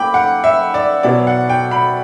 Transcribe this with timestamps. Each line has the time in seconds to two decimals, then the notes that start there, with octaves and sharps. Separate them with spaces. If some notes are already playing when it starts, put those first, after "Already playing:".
Already playing: A#3 E4 G5 B5 D6
0.14 F#5
0.44 E5
0.74 D5
1.03 B2 F#3 B3 E4 D5
1.27 F#5
1.49 G5
1.71 B5